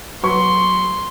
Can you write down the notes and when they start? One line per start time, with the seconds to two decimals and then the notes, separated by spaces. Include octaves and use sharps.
0.23 F#3 B4 C6 C#6